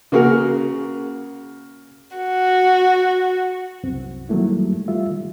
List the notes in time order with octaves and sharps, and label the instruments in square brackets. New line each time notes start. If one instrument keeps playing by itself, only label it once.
[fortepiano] C#3 A#3 F#4 G#4 A#4
[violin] F#4
[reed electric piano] C2 F#2 C4
D#3 F#3 G3 A3 A#3 E4
G3 A3 F4 E5
D#3